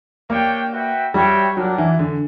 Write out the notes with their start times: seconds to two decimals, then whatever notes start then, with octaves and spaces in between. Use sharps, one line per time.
0.30 A#3 D4 G4 C#5 G5
0.72 F#4 B4 E5 G5
1.14 G3 F#4 C#5 E5 G5
1.57 F#3 A#3 D4 A#4 D5 F#5
1.78 E3
1.99 D3